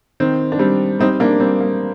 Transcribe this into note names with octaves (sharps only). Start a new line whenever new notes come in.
D#3 C4
D4
G3 C4
G3 C4 D#4
A#3 D4
G3 C4
A#3